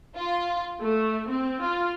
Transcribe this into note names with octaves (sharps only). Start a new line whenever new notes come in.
F4
A3
C4
F4